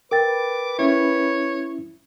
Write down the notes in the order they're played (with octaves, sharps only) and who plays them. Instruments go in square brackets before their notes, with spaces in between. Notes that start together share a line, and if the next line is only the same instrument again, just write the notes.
[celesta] A#4 G5 A6 [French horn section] B4 [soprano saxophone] D6
[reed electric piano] C#4 E4 [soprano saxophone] C#5